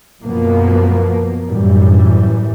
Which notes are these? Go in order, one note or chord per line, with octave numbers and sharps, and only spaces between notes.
F#2 B2 F3 A#3 B3
F#2 A2 E3 G3